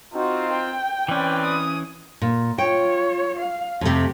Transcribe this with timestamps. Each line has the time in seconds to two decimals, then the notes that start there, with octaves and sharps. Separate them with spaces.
0.13 C4 D#4 F4 F#4
0.53 G5
1.08 E3 C4 C#4 B4 D5
1.45 D#6
2.22 A#2
2.58 F4 C#5 G5
3.39 F5
3.81 F2 C3 A3 G4